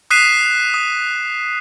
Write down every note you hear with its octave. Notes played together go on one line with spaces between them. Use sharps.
D#6 F#6 B6 C7 D#7 E7
D#6